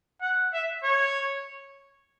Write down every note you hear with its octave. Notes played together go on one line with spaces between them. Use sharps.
F#5
E5
C#5